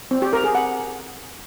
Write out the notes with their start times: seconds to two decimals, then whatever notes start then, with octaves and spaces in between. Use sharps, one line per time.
0.11 C4
0.22 G4
0.33 A#4
0.44 G#4
0.55 F#5